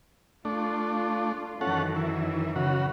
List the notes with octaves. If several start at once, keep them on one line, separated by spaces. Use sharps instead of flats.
A3 D4 F4
F#2 D#3 E3 C#4 A4 F#5
E4
C#3 F#4